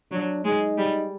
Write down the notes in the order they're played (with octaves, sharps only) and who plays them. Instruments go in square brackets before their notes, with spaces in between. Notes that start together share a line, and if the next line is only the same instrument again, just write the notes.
[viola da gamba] F#3 [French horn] D4
[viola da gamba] G#3 [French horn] D#4
[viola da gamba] G3